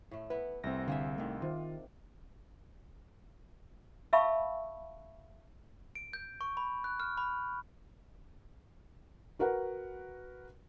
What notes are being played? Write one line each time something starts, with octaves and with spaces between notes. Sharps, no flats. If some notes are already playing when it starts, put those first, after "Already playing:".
A2 A3
B3 E4 B4
C2 A3 C4 A#6
D3 A#3 G#4 E5
D#3 A3 D4
C3 D#3 F4
E5 F5 A5 B5 C#6 E6
D7
G6
C#6
B5
F#6
F6
B5
F#4 A#4 B4 F#5